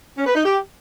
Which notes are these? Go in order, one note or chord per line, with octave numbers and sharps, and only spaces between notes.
C#4
B4
D#4
G4